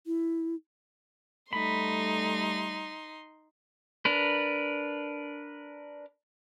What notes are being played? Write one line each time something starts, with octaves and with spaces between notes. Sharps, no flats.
E4
G3 A3 D#4 B5 C6
D4 A#4 B4